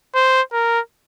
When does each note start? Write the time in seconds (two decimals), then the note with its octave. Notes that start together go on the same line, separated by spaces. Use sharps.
0.15 C5
0.53 A#4